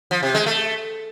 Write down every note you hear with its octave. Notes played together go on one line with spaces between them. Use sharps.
F3
C3
G#3
A3